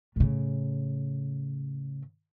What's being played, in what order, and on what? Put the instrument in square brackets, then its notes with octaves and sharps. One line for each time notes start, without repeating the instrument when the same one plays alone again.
[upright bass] A2 C#3